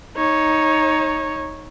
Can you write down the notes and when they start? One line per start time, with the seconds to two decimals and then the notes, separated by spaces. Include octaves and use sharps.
0.17 D#4 C#5